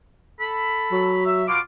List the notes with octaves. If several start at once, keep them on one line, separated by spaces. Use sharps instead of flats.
A4 B5
F#3
E5
B2 F4 D6